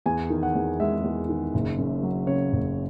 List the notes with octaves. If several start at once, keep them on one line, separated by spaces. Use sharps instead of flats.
E2 G#5
D#3
F#5
E2
G#3 E5
E2
D#3
F#1
F#2
F#3
C#3 C#5
F#1